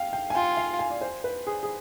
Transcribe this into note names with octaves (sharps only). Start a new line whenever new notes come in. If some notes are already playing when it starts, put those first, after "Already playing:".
Already playing: F5 G5
G5
G#5
F4 G5
F5
G#5
D5
C5
B4
G#4
G#4